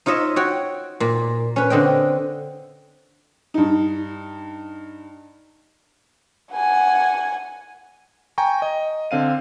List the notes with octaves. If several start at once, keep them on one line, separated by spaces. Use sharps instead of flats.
D#4 F4 C#5 D#5 E5
F#4 C#5 G5
A#2
C#4 B4
D3 C4 D#5 G5
G2 D#4
F#5 G#5
G5 G#5 A#5 C#6
D#5
D3 C4 F5 D#7